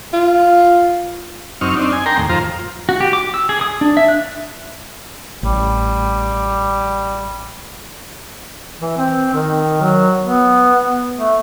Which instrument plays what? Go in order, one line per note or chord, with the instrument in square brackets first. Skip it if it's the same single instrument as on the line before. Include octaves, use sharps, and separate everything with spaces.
[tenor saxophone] F4
[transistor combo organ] F#2 C4 D#4 C#6 F6
C4 D4 D#4
G#5
A#4 G5 A#5 C6
D#2 A2
F2 F4 C5 A#5
[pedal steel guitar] F#4
G4
D6
E6
G#4
D#6
D4
E5
F#6
[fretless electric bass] A1 [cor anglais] G3
[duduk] E3
C4
D#3
F#3
B3
A3